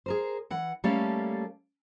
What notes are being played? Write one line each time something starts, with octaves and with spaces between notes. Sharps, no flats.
G#4 A#4 C5
E3 F#5
G3 A3 A#3 C#4 A4 F5